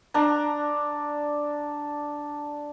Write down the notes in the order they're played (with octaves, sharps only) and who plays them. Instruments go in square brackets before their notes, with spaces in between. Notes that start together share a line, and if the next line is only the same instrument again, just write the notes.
[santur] D4 A#5